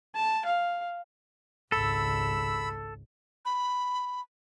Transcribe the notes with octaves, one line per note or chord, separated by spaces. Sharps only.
A5
F5
G#1 C#2 A4 B5 E6
B5